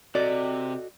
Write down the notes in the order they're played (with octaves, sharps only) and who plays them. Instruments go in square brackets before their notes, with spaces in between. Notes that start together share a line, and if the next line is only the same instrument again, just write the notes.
[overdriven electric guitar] C3 [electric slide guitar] F#4 A4 D#5 [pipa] D5